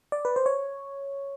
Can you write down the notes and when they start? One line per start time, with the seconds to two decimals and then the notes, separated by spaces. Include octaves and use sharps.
0.12 D5
0.25 B4
0.36 C5
0.46 C#5